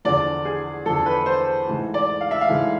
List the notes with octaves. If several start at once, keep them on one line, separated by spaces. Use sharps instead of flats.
E2 D3 F3 D5
G#4
E2 D3 F3 A4
B4
C5
G#2 E3 A3
D5
F5
E5
F5
G#2 E3 A3